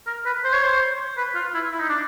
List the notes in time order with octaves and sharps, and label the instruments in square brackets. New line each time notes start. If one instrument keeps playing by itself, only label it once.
[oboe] A#4
B4
C5
C#5
C5
B4
F4
E4
E4
D#4
D4